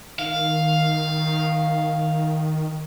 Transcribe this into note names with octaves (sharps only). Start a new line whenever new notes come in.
D#3 F5